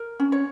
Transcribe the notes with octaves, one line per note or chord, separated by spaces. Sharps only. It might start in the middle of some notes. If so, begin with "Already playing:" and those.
Already playing: A#4
C#4
C#5